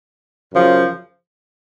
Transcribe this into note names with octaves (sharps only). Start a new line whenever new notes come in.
F#2 C#3 F3